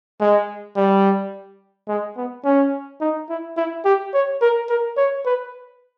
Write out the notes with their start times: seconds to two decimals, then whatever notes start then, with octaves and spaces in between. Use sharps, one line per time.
0.20 G#3
0.76 G3
1.88 G#3
2.17 B3
2.45 C#4
3.01 D#4
3.29 E4
3.57 E4
3.85 G4
4.13 C#5
4.41 A#4
4.69 A#4
4.97 C#5
5.26 B4